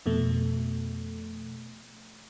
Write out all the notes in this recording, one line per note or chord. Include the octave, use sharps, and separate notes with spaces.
F2 B2 A3